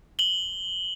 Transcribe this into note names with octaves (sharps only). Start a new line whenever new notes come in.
F#7 G7